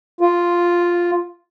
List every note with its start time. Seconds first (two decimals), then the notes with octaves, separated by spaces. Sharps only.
0.21 F4